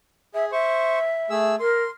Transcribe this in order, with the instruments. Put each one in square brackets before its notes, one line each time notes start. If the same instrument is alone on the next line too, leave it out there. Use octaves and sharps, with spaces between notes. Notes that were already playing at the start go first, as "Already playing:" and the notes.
[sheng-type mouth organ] G#4 [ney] E5
[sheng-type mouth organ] C5 C#6 [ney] E5
[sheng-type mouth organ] A3 G#4 E6
[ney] A#4 [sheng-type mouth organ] C6